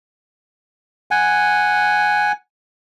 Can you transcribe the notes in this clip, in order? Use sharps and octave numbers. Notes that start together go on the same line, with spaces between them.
F#5 G#5